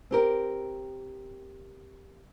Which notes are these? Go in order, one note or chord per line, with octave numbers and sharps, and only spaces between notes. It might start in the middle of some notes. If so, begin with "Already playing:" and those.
C4 G4 A#4